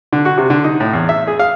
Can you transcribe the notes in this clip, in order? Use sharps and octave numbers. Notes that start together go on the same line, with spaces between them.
D3
F#4
C3
D3
D#4
A2
E2
E5
G#4
F5